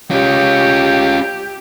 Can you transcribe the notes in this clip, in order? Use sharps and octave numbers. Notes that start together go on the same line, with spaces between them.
C#4 F4 G4